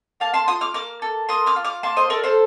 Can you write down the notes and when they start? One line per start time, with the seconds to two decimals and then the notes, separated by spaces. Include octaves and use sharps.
0.20 A#3 F5 A5
0.34 A5 C6
0.48 F4 C6 D#6
0.61 D6 F6
0.74 A#3 D6 F6
1.02 A4
1.29 A#3 C6 D#6
1.46 D6 F6
1.56 F4
1.64 D6 F6
1.83 A#3 A5 C6
1.97 C5 D#5
2.10 A4 A#4 D5
2.24 A4 C5